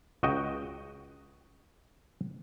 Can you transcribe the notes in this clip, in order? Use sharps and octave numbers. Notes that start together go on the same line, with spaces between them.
C#2 F#4 D#5 G5